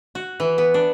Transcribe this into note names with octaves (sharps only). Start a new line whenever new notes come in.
F#4
E3
B3
D4